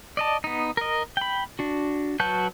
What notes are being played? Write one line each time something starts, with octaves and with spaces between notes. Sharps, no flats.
D5 D#5 A5
B3 D#4
A#4 D#5
G5 B5
D4 F#4
F#3 F#4 B4 A5 G6